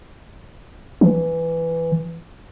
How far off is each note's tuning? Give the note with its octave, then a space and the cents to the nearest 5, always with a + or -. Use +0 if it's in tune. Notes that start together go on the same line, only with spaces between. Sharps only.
E3 +5